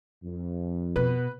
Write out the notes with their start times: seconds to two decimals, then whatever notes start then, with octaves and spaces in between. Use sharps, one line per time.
0.24 F2
0.96 B2 B4